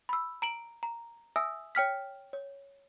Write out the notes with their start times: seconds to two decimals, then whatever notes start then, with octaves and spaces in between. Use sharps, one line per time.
0.09 B5 E6
0.42 A#5 D7 F#7
0.83 A#5
1.36 E5 G#5 D#6 E6
1.75 C#5 G5 F6 B6
2.33 C#5